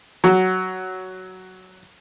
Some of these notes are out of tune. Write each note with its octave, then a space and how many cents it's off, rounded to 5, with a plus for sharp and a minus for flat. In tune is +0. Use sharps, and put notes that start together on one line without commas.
F#3 +10